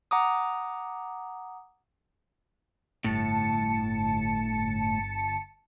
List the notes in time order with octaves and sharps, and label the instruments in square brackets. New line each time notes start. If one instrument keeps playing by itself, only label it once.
[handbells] F#5 A#5 D6 D#6
[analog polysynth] G1 A5 C#7 [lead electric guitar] A2